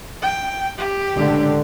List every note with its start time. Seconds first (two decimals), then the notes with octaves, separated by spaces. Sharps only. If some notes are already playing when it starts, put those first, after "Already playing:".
0.22 G5
0.77 G4
1.16 C#2 A2 D3